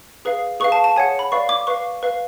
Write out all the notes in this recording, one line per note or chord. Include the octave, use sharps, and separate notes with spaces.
G#4 B4 F5
G#4 B4 F5 C#6
A5
A5
G#4 C#5 F#5 G#5
B5
B4 D5 F5 C#6
D6
B4 F5 C#6
B4 F5